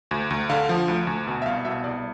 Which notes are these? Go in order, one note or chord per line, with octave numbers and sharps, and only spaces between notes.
D2
D2
D3 F5
F3
D2
D2
B2
E5
C2 F5
B2 E5
C2 D5